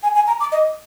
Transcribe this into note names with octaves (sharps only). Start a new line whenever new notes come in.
G#5
G#5
A#5
D6
D#5